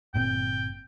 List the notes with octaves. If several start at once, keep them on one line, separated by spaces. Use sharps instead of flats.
G1 A#2 C4 G5